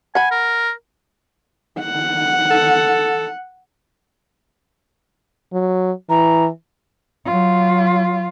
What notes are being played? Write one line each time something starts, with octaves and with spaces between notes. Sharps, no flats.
F#5 G#5 B5
A#4
F#5
A4
F#3
E3 A#5
F#3 F4